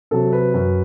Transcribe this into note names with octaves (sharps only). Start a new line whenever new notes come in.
C3 F#3 A4
B4
F#2